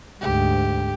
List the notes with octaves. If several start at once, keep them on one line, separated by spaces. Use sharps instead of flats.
D2 G#2 G4